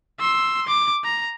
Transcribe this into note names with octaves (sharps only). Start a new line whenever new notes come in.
C6 E6
D6
A#5